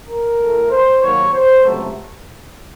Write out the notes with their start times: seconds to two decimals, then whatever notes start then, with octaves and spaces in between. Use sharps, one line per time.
0.08 A#4
0.40 A2 A3
0.71 C5
1.02 D#2 D#3 F#3 A#3 C#5
1.33 C5
1.64 C#2 C3 F#3 A3